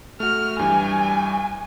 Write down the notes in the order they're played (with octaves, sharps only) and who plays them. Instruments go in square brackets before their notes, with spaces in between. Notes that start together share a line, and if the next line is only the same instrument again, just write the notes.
[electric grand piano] A3 F#4 [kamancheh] F6
[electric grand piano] G2 E3 G3 [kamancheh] G#5